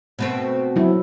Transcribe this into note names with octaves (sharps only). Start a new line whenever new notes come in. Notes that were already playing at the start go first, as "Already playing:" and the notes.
B2 A3 C4
F#3 E4